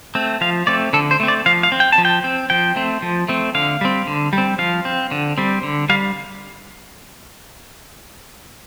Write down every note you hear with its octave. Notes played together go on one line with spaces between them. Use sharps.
A3 C4
F3 F5
A3 C4 D5
D3 A4
C5
A3 C4
D5
F3 F5
F5
C4
G5
A5
F3
G5
C4
F3 G5
A3 C4
F3
A3 C4
D3 F5
G3 C4
D3
G3
C4
F3 F5
C4
D3
G3 C4
D3
G3 F5